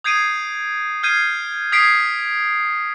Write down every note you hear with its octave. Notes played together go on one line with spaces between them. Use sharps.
D#6 G6 G#6 C7 D7 D#7
F6 G6 G#6 C7 D#7
D#6 G#6 B6 C7 D7